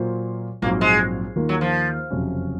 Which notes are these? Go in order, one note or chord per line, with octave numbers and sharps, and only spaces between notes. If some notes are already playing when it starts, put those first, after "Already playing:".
Already playing: A#2 F#3 A#3 F4 C5
A#1 G#2 F#3 A#3 C4
G#3
D#2 D#3 A#3 F4 A#4
F#3
F3
F#1 F2 C3 F#3 C#4